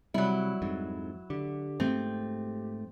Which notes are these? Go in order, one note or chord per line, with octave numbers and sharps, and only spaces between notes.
C3 F#3 G3 E4
F2 G#2
D3 G4
G#2 F3 A3 C4